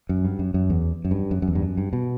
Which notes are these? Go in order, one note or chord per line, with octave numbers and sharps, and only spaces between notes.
F#2
G2
F#2
F#2
E2
F#2
G2
F#2
F#2
E2
G2
F#2
G2
B2